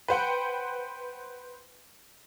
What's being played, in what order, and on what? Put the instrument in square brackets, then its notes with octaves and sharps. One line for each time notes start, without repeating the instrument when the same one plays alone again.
[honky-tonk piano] B4 C5 F#5 G5